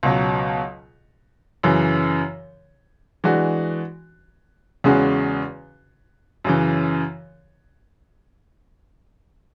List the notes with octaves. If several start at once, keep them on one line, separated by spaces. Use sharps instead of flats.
C#2 B2 F#3
F#2 C#3 E3
E3 G#3 D4 F#4
E2 C#3 G#3 C#4 F#4
F#2 C#3 E3